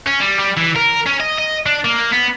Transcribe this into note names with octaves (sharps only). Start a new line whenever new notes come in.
C#4
G3
G3
E3
A#4
C#4
D#5
D#5
D4
A#3
B3